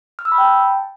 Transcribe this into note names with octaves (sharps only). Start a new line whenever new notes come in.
F6
E6
B5
G5
A5